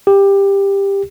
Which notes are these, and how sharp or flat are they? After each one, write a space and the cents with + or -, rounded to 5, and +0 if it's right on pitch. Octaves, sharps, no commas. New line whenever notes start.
G4 +15